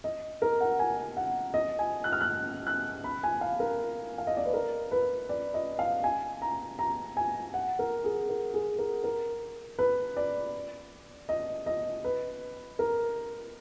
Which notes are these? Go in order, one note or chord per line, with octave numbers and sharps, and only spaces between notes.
D#5
A#4
F#5
G#5
F#5
D#5
G#5
F#6
F6
F#6
F#6
B5
G#5
F5
A#4
F5
D#5
D5
B4
A#4
B4
D5
D#5
F5
G#5
A#5
A#5
G#5
F#5
A#4
G#4
A#4
G#4
A#4
A#4
B4
D5
D#5
D#5
B4
A#4